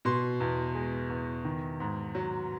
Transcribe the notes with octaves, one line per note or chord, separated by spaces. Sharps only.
B2 C6
E2
G#3
E2
D#3
G#2
F#3